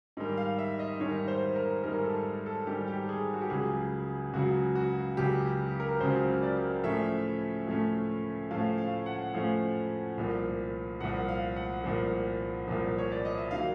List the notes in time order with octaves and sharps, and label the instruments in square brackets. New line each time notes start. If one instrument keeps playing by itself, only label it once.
[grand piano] G#2 D#3 G3
F5
E5
D#5
G#2 D#3 G3 C#5
C5
A#4
G#2 D#3 G3 A#4
A4
A4
G#2 D#3 G3 G4
G4
G#4
F#4
G4
C#2 C#3 F#3 G#4
C#2 C#3 F#3 F#4
F#4
C#2 C#3 F#3 G4
A#4
C#2 C#3 F#3 C5
D5
A2 F3 A3 C#4 E5
A2 F3 A3 C#4
A2 F3 A3 C#4 F5
F5
F#5
A2 F3 A3 C#4 F5
C2 A#2 F3
C2 A#2 F3 F#5
F5
F#5
C2 A#2 F3
C2 A#2 F3
C#5
D5
D#5
E5
D#3 F#3 A#3 F5